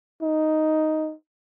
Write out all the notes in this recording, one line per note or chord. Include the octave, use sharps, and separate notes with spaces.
D#4